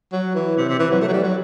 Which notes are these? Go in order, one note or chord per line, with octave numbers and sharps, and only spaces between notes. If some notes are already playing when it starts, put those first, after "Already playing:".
F#3
E3
C3
C3
E3
F#3
A3
F#3
G3
F#3